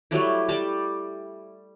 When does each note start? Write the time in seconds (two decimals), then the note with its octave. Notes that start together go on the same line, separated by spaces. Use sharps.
0.11 F#3 G3 A3 E4
0.49 G3 A5 D6